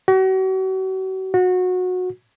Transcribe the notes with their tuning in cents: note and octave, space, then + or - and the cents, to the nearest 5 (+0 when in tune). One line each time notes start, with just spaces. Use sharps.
F#4 +40
F#4 -20